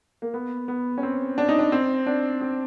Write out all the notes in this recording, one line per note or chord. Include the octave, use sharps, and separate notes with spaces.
A#3
B3
B3
C#4
C4
D4
D#4
D4
C4
D4
C4